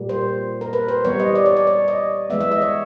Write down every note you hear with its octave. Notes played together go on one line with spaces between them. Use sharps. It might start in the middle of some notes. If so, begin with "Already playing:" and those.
Already playing: A#2 G3 A#3
C5
A#4
B4
C5
E3 G3 B3 C#5
D#5
D5
C#5
D5
C#5
D#5
E3 G#3 B3 E5
E5
D#5
C#5